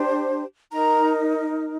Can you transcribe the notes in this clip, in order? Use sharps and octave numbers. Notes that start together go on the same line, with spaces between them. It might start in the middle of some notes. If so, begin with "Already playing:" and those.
Already playing: D4 G4 C5
D#4 A#4 A#5